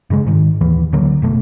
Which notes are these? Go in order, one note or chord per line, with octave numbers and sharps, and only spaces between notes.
G2 C#3 G3 G#3
G#2 D#3
D#1 D#2 E3
D2 D3 F#3 A#3
F1 B2 A3